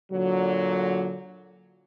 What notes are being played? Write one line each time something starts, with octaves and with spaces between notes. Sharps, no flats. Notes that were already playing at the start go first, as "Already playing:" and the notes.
A#2 D3 F#3